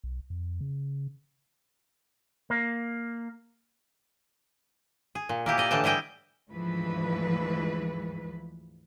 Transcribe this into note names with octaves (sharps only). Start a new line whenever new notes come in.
B1
F2
C#3
A#3
G#4
A#2
A#3 E4 G4 G#4
D5 D#5 A#5
A2 D3 E3 G5 A5
G3 E4 G#4 D#5 G5
D2 G#2 E3 F3 B4